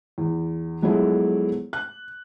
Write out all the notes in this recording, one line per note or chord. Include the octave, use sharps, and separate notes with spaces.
E2
F3 F#3 G#3 A3 B3 E4
F#6